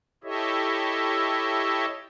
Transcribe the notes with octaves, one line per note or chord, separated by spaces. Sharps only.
E4 G4 A4 C#5 D#5 E5